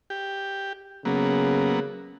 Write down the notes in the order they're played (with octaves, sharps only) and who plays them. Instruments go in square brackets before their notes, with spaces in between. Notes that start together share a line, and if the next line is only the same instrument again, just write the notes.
[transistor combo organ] G4
[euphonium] C#3 [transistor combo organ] F#3 A#3 B3